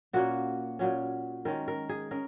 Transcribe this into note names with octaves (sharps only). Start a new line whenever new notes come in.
A#2 A#3 C#4 F#4
A#2 F#3 C#4
D#3 G#3 C#4 A#4
A#4
G#4
C#4 A#4